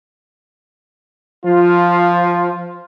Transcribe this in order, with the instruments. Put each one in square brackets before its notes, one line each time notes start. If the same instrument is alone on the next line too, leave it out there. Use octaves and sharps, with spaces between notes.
[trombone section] F3 F4